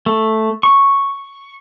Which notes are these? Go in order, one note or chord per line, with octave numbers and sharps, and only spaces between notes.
A3
C#6